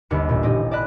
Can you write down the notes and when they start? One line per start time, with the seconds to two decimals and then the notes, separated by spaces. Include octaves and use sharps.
0.10 G1 D#2 B5 C#7
0.29 A1 A#2
0.43 C4 D#4 G4 D#5
0.71 D5 D#5 A5 B5 F#6